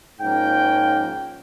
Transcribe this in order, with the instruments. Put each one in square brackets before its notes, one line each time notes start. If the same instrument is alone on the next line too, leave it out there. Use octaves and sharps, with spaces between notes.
[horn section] G#2 F3 A#3 C#4 G5